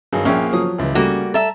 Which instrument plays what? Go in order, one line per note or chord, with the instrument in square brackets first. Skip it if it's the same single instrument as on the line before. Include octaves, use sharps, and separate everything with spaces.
[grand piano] G2 D#3 F#3 [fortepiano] G#4
[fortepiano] A#1 E5 G5 [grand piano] A#3 G#4 [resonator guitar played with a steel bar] C#4
[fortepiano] F3 F#3 D#6
[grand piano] C#2 E3
[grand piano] C#3 [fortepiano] G3 A3 [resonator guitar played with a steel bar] A#3 F#4
[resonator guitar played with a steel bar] A4 E5 [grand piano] A#5